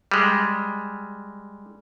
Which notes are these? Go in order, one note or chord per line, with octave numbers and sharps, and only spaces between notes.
G3 G#3